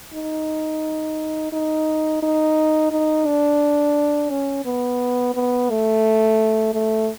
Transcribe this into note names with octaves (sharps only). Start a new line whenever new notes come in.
D#4
D#4
D#4
D#4
D4
C#4
B3
B3
A3
A3